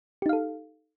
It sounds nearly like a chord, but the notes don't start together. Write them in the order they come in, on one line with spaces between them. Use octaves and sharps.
G4 D#4 F5 A4